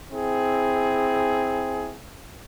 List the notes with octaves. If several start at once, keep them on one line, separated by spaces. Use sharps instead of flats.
C4 E4 G#4